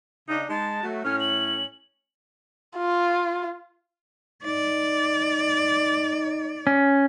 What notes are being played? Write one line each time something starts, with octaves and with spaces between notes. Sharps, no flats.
C#3 D4 D#4
G#3 D#4 A5
F#3 A3
A2 C#4 F6
F#7
F4
D#4 D5
C#4